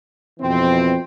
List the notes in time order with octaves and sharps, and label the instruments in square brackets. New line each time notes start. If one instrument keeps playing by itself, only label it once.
[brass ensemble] F2 B2 E3 C4